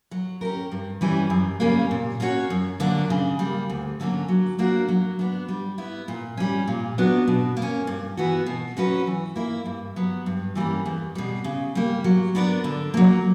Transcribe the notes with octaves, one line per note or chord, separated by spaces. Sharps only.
F#3
C#4 G4 A#4
G2
E3 G3 C#4 E4
F#2
C#3 G3 A#3 C#4
A#2
A#3 C#4 F#4 C#5
F#2
D3 F#3 A#3 D4
C#3
G3 A#3
D2
D3 F#3 A#3 C#4
F#3
A#3 D4 F#4 A#4
F#3
B3 D4
G3
B3 E4
A#2
G3 C#4
A#2
F#3 B3 D4
B2
A#3
C#4
G2
E3 B3 F#4
B2
F#3 C#4 F#4 B4
E3
A#3 E4
G2
F#3 B3
G2
E3 G3 A#3 C#4
E2
B2 G3
C#3
G3 A#3
F#3
B3 D4 A#4 D5
D3
F#3 A#3